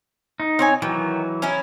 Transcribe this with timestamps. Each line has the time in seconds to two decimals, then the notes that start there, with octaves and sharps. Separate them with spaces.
0.40 D#4
0.59 C4 C#5 G#5
0.82 D#3 E3 F#3
1.42 C#4 D#4 E4